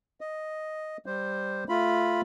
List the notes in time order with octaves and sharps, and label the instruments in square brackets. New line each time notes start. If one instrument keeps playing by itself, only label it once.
[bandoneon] D#5
G3 C5
A3 F4 B5